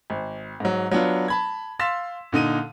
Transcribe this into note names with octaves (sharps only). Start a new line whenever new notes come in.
G#1
G#2 F#3
F#3 B3 D4 F4
A5 B5 G#6
F5 C6 E6 A6 B6 E7
A#2 D3 D#4 D#7